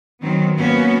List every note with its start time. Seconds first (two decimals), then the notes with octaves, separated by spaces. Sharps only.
0.21 D#3 F#3 B3 C4
0.56 A#3 B3 C#4 F#4